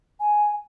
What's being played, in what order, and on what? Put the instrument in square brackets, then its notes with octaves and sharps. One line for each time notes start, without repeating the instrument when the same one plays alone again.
[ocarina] G#5